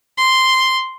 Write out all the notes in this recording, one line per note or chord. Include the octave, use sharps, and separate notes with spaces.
C6